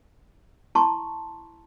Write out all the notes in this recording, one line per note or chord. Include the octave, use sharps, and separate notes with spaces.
E4 A5 A#5 C6 C#6